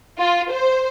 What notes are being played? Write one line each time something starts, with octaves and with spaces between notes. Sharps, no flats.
F4
C5